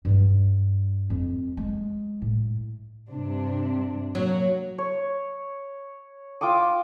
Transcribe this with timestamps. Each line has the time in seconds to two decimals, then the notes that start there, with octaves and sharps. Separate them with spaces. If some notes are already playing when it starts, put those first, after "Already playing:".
0.05 G2 G3
1.10 F2
1.57 G#3
2.22 A2
3.08 G2 C3 D4
4.15 F#3 A#3
4.78 C#5
6.41 F4 G5 D6 D#6